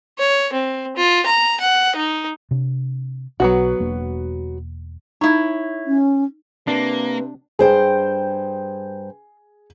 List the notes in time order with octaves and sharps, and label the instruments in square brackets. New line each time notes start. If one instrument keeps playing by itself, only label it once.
[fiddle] C#5
C4
F4
A#5
F#5
D#4
[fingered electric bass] C3 D4
[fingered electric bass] B1 [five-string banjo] F#3 B3 F#4
[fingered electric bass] E1 A#3 D4
[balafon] D#4 [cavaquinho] E4 C#5
[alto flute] C#4
[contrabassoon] C3 [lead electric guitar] A#3 [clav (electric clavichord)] D4 [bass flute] B4
[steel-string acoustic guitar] G2 C5 G5 [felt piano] G#4